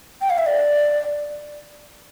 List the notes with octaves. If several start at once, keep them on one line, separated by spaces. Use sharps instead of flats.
G5
F5
E5
D5